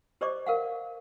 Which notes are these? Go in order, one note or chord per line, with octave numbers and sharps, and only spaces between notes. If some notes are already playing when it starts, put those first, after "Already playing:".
G4 C5 D5 D#5 C#6 D6
A#4 F5 F#5